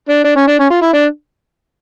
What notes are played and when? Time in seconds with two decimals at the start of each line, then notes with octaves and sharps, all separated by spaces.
0.09 D4
0.24 D4
0.36 C#4
0.48 D4
0.59 C#4
0.70 F4
0.82 E4
0.94 D4